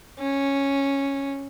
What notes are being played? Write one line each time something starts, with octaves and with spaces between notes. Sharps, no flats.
C#4